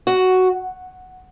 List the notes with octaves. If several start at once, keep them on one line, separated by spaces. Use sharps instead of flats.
F#4